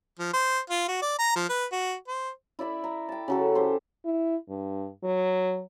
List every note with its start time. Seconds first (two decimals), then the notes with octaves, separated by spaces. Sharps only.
0.19 F3
0.33 C5
0.70 F4
0.88 F#4
1.02 D5
1.19 A#5
1.36 F3
1.49 B4
1.72 F#4
2.08 C5
2.59 E4 D5 E5 B5
2.84 A#5
3.09 G5 A5
3.28 C#3 F#3 A4
3.55 G4 A4 C5
4.05 E4
4.49 G2
5.04 F#3